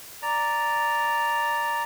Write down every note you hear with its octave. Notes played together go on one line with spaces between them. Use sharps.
D5 A#5